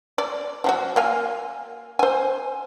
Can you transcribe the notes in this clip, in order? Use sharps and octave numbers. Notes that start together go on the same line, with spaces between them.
D5
F3 F#3 F#4
A#3 F5 G#5
C5 G#5